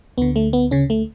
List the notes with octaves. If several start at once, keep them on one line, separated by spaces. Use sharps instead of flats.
D2 D3 B3
A3
B3
C#3 C#4
A3